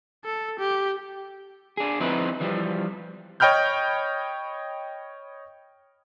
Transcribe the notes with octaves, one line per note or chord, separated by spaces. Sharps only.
A4
G4
D4 G#4
F3 C4 D#4 E4 B4
E3 F3 G3
C#5 D#5 G5 B5 F6 G6